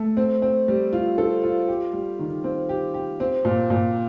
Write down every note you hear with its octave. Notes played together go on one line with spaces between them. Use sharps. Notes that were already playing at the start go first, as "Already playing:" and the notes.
Already playing: A3
C4
C4
G3
F4
A4
F4
G4
G3
D#3
C4
G4
G4
C4
A#2
A#2